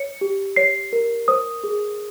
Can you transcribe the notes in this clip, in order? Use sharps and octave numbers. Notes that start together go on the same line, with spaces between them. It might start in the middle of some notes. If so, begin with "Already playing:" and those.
Already playing: C#5 C#7
G4
C#5 C7
A#4
C5 D#6
G#4